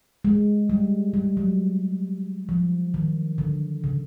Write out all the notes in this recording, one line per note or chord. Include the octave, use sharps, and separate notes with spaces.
G#3
G3
G3
F#3
F3
D#3
D3
C#3